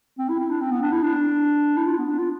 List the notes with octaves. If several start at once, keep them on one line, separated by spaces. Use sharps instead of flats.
C4
E4
E4
D4
C4
B3
D4
E4
D4
E4
F4
B3
D4
F4